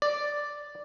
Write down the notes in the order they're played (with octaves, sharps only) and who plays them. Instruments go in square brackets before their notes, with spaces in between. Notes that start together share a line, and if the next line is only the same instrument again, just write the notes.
[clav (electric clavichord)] D5